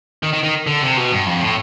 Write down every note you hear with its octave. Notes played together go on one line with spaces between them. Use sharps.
D#3
D#3
D#3
D3
C3
B2
G2
F2
A2